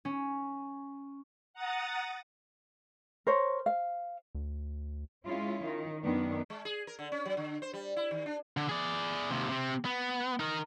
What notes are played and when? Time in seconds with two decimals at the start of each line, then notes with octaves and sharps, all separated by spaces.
0.05 C#4
1.54 F#5 A#5 D#6 A6
3.27 A#4 C5 C#5
3.66 F5
4.35 D2
5.25 G#3 C#4 E4 F4
5.64 D#3
6.02 F#2 D#3 B3 D4
6.50 G#3
6.65 G#4
6.87 A#4
6.99 D3
7.12 C#4
7.25 F#3
7.37 D3
7.62 C5
7.73 G3
7.97 E4
8.11 D#3
8.26 D4
8.57 D3
8.69 G#4 D5
9.30 D#2 C3
9.49 C3 C4
9.85 B3
10.40 D#4 A#4